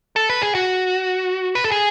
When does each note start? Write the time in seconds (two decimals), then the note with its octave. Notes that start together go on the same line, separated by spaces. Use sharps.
0.16 A4
0.30 B4
0.42 G#4
0.55 F#4
1.55 B4
1.64 A4
1.71 G#4